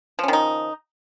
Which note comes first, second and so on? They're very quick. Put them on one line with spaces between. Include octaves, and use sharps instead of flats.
F3 C#4 D#3 D#4